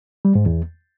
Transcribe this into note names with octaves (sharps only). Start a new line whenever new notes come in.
G3
G#2
E2